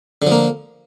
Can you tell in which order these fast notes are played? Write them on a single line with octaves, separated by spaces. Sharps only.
D3 F3 A#3